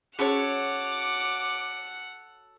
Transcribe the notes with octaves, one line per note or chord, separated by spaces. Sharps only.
C#4 F#4 G#4 A4 C#5 F#5 D6 F7